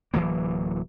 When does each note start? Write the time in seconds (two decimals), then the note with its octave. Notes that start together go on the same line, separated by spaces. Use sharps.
0.14 D1 E3 F#3 A#3